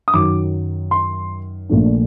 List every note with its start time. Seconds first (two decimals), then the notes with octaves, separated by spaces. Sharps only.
0.08 D#6
0.13 F#2 D#3 F#3 D6
0.91 C6
1.69 A#1 A#2 A3 D4